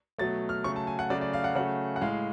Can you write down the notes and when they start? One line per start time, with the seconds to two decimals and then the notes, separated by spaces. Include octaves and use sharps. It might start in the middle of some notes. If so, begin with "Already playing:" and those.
0.19 B2 F#3 A3 A6
0.49 F6
0.64 C#3 F#3 A3 C#6
0.76 A5
0.87 G#5
0.99 F#5
1.10 C#3 F#3 A3 D5
1.21 D5
1.33 F5
1.44 F#5
1.55 C#3 F#3 A3 F#5
1.96 F#5
2.01 A2 G#3 F5